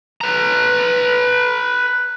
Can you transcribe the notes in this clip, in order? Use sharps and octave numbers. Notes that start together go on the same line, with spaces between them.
B4 A#5